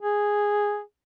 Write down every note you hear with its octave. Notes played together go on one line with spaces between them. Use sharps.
G#4